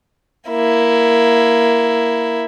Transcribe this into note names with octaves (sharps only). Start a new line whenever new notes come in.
A#3 E4